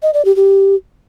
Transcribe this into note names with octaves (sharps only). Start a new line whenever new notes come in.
D#5
D5
G4
G4